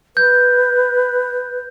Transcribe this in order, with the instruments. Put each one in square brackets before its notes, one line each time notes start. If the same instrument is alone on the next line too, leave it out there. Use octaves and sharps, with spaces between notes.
[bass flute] B4 [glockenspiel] G6